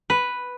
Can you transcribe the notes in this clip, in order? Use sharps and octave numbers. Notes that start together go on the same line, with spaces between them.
B4